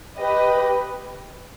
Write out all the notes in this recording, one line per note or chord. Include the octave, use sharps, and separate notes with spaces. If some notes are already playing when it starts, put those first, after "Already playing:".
G4 B4 D#5